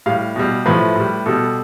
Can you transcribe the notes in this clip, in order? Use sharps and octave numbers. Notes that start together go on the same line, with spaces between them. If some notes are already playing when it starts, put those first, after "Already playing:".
A2 G3 F5
B2 G3
A2 F3 A3 B4
A2 G3
B2 G3 A4